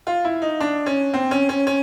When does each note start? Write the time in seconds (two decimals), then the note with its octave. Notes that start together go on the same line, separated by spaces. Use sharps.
0.07 F4
0.25 E4
0.42 D#4
0.60 D4
0.86 C#4
1.14 C4
1.31 C#4
1.49 C#4
1.67 C#4